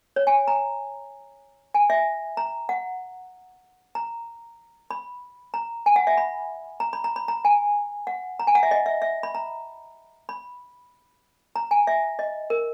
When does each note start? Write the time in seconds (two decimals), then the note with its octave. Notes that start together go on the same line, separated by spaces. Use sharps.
0.16 C#5
0.27 G#5
0.48 A#5
1.74 G#5
1.90 E5
2.37 A#5
2.69 F#5
3.95 A#5
4.91 B5
5.54 A#5
5.86 G#5
5.96 F#5
6.07 E5
6.17 B5
6.80 A#5
6.93 B5
7.04 A#5
7.16 B5
7.28 A#5
7.45 G#5
8.07 F#5
8.39 A#5
8.47 G#5
8.55 F#5
8.63 E5
8.71 D#5
8.86 E5
9.02 E5
9.23 B5
9.35 A#5
10.29 B5
11.56 A#5
11.71 G#5
11.87 E5
12.19 D#5
12.50 A#4